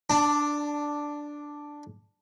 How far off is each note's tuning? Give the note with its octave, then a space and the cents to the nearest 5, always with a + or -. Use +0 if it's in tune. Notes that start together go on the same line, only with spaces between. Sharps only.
D4 +0 A5 +30